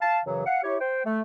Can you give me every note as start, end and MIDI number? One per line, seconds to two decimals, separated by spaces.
0.01 0.19 77
0.01 0.19 81
0.25 0.44 42
0.25 0.44 49
0.25 0.44 52
0.25 0.44 54
0.46 0.62 77
0.46 0.62 78
0.64 0.76 64
0.64 0.76 67
0.64 0.76 73
0.80 1.01 72
0.80 1.01 79
1.05 1.21 57